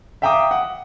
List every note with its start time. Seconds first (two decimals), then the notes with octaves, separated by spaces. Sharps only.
0.22 E5 F5 G5 A#5 D6 D#6
0.51 F#5